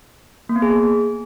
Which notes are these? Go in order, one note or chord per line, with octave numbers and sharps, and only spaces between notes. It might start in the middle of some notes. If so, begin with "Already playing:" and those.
A#3
B3
G#4